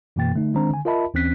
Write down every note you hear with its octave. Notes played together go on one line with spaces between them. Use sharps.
F#2 B2 E3 A#3 G5 A6
D3 A3 D#4
D#3 G#3 C4 D4 C5 A#5
D3 G#5
F4 A#4 D#5 E5 A5 B5
D#2 E3 C4 C#4 F#6 B6